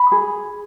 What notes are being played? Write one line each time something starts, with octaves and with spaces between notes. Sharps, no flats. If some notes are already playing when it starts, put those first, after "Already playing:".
Already playing: B5
G#4